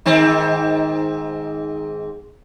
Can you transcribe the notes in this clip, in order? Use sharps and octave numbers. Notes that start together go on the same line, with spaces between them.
G#2 D#3 C4